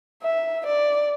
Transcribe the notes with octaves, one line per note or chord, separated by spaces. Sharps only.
E5
D5